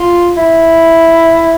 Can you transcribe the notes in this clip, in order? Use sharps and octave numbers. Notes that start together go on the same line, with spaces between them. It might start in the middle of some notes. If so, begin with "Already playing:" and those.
Already playing: F4
E4